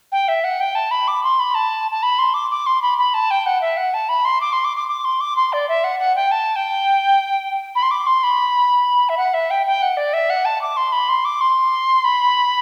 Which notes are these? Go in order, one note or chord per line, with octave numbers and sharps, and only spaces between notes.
G5
E5
F#5
G5
A5
B5
D6
C6
B5
A5
A5
B5
C6
D6
D6
C6
B5
B5
A5
G5
F#5
E5
F#5
A5
B5
C6
D6
C6
D6
D6
D6
C6
D6
C6
D5
E5
F#5
F#5
G5
A5
G5
B5
C6
D6
C6
B5
E5
F#5
E5
G5
G5
F#5
D5
E5
F#5
A5
D6
C6
B5
C6
D6
C6
B5